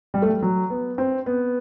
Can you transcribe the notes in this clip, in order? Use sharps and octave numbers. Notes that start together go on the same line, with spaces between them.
G3
A3
G3
F#3
B3
C4
B3